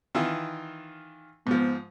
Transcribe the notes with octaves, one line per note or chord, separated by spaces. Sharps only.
D#3 E3 F4
G#2 F3 B3